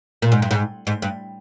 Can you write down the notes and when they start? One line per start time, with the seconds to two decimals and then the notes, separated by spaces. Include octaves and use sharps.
0.22 A#2
0.32 G#2
0.42 G2
0.51 G#2
0.87 G#2
1.02 G2